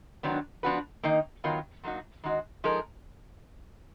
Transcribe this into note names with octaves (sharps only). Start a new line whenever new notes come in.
G#2 D#3 F#3 B3 D4
F3 B3 D4 F#4 B4
D#3 A#3 D#4
D#3 F#3 B3 F4 A#4
A#2 F#3 A#3 D#4 F#4
D#3 G#3 D#4 F#4
F3 G#3 D#4 A#4